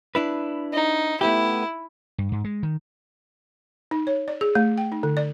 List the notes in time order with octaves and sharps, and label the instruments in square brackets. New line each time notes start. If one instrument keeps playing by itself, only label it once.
[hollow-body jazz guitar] D4 E4 B4
[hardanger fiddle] D#4
[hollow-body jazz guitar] A3 B3 G4 [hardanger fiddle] E4
[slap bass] G2
G#2
G#3
D#3
[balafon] D#4
C#5
D5
G#4
A3
G5
D#4
D3
D5